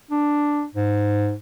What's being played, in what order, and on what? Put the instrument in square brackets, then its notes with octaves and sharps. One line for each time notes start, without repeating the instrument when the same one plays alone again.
[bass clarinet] D4
G#2